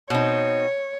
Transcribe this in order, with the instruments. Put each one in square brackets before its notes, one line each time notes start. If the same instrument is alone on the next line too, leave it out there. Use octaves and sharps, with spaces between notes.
[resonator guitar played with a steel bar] B2 C4 D#4 [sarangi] C#5